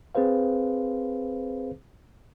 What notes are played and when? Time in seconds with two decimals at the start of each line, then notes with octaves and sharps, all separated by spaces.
0.15 C4 G#4 B4 C5 F5